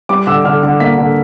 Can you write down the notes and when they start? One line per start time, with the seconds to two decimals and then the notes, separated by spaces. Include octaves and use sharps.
0.09 G3 D6
0.27 D3 E6
0.45 D3 F6
0.63 D3
0.80 A#3 B6
0.98 D3